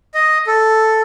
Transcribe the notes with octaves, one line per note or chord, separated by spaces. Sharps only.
D#5
A4